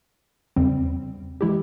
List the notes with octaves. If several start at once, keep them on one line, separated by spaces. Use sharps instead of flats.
E2 C#3 G3 C4
E3 G#3 E4 G4